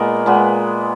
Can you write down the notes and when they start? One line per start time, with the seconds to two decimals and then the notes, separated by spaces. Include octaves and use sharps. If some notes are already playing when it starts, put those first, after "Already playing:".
Already playing: A#2 G#3 B3 A#4
0.26 A#2 G#3 B3